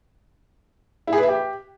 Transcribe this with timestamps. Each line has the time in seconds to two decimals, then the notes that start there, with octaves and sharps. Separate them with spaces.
1.07 E4
1.13 G#4
1.18 B4
1.23 E5
1.28 G4